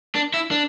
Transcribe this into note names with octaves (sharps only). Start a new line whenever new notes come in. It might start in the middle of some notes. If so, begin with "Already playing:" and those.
D4
E4
D4